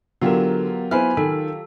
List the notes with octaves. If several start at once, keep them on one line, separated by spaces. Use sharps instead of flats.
D3 F#3 B3 F4 G4 A#4
B3 E4 C5 G#5 B5 F6
D#3 A4